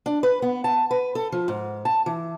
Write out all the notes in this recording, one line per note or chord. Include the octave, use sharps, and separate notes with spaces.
D4
B4
B3
A5
B4
A4
F3
G#2
A5
E3